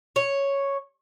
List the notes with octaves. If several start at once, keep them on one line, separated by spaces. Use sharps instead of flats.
C#5